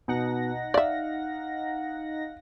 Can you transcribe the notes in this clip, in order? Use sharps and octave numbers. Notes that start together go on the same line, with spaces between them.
B2 D#4 F#5 A#6
D5 E5 F5